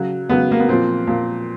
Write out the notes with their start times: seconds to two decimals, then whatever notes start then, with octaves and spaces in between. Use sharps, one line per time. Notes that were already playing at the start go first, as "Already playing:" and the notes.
Already playing: C#3 F#3
0.29 C#3 F#3 B3
0.51 A#3
0.60 B3
0.68 A#2 F3 C4
1.07 A#2 F3